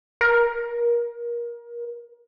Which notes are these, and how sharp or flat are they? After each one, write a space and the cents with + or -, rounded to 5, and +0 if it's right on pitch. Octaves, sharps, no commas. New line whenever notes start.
A#4 +25